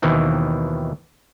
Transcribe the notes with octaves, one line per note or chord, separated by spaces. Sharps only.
D#2 B2 D#3 E3 C4